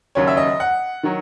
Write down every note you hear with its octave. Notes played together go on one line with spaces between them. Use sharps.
D#2 C#3 F#3 C#5
E5
D#5
F#5
D#3 F#3